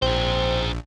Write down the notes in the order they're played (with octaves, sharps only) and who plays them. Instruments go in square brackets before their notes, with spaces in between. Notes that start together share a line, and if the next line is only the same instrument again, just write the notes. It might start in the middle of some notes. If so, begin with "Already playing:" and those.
[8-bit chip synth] A#1 [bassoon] C4 [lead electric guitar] G#4 C5